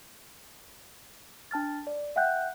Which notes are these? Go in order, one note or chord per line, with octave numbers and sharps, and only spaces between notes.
D4 A5 F6 A6
D5
E5 F#5 G5 F#6 G6